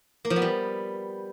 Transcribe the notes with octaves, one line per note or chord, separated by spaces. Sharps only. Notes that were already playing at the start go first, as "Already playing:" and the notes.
A#3
F3
B3
G3